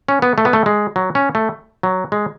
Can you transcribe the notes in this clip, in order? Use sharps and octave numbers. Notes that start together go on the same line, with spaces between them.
C#4
B3
A3
B3
A3
G#3
F#3
C#4
A3
F#3
G#3